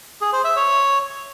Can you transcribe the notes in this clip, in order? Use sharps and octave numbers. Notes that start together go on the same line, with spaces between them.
G#4
C5
E5
C#5